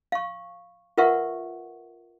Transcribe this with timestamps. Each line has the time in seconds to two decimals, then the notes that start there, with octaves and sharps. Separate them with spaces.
0.12 F5 C#6
0.98 F4 A#4 B4 E5 F#5 C#6